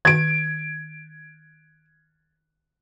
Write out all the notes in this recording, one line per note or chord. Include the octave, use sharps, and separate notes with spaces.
D#3 G#6 D7